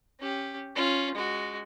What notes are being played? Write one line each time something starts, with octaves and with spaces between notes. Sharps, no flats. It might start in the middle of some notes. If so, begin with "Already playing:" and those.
C#4 G4
C#4 F4
G#3 F#4